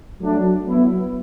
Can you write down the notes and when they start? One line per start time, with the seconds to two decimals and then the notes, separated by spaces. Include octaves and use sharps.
0.21 F#3 A3 D4
0.67 F#3 B3 E4